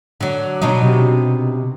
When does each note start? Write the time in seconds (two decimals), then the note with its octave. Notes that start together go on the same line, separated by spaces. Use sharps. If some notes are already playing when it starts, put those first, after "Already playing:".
0.21 D3 F#3
0.62 B2 F#3 D4 D#4
0.83 C3